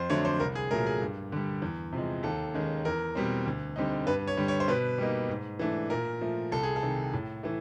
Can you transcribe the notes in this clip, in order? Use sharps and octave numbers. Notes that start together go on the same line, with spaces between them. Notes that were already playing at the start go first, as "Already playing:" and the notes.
Already playing: F2 C5
D3 F#3 A3 D4 C#5
C5
C2 A#4
G#4
A#2 F#3 A3 A#4
G#4
G2
D3 G3
E2
C3 F3 G#3
D#2 A4
D#3 G#3 C#4
E2 A#4
B2 G3 C4
D2
D3 G3 C4 D#4
G2 B4
C#5
D3 G3
C#5
C5
B2 B4
G3 A#3 D#4
G#2
E3 A3 D4
A#2 A#4
F3 A3
C2 A4
G#4
A4
C3 D#3
A2
E3 A3